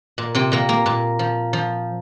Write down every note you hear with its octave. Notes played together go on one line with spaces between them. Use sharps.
A#2
C3 C4
A#2 A#3
A#3
A#2
F3
F3